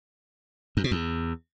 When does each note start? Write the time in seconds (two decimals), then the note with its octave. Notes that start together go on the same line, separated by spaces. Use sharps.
0.77 F#2
0.84 B2
0.91 E2